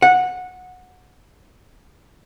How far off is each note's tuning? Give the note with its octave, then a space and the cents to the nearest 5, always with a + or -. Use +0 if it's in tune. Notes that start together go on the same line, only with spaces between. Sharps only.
F#5 -15